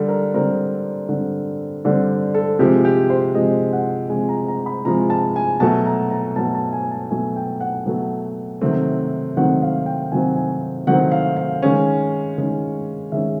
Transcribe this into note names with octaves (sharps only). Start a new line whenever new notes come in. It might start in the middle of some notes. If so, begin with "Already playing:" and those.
Already playing: D3 G3 A4
A#4
D3 G3 C4 A#4
D3 G3 C4
D3 G3 C4 A4
A4
C3 F3 G#3 G4
G4
C5
C3 F3 G#3 D#5
F#5
C3 F3 G#3 G#5
A#5
A#5
B5
C3 F3 G#3 A#5
A5
G#5
B2 F#3 A3 A5
A#5
A#5
B2 F#3 A3 A5
A5
G#5
A5
B2 F#3 A3 G#5
G5
F#5
B2 F#3 A3
C3 D#3 F#3 A3 C4
C3 D#3 F#3 A3 C4 F#5
F5
G5
C3 D#3 F#3 A3 C4 G#5
G#5
C3 D#3 F#3 A3 C4 F#5
F5
F5
D#3 G#3 C#4
D#3 G#3 C#4
D#3 G#3 C#4 E5